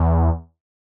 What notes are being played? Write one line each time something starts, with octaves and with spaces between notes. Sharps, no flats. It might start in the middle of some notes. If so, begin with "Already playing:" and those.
Already playing: E2